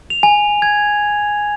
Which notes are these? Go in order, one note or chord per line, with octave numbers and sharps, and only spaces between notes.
F7
G#5
G#6